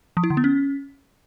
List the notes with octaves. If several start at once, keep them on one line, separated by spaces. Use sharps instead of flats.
F3
E4
D3
B3
C#4